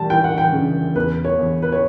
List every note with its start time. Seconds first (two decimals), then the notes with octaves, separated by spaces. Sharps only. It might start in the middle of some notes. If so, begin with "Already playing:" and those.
Already playing: G3 A5
0.10 E3 G5
0.24 F#5
0.38 G5
0.53 C#3
0.95 E2 B4
1.25 C#5
1.39 E2
1.62 B4
1.72 C#5